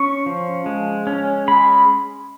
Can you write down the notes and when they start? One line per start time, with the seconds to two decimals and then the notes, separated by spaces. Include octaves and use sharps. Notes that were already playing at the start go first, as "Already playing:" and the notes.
Already playing: C#4 C#6
0.26 F3
0.66 G#3
1.07 C#4
1.48 G#3 B5